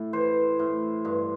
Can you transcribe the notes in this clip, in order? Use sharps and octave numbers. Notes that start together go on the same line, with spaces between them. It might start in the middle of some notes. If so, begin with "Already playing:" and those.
Already playing: A2 A4
E3 C5
A2
G2